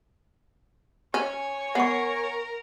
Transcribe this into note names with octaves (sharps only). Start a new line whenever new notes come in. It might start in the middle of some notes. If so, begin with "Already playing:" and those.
C#4 C#5 G#5
B3 A#4 F#5 C#6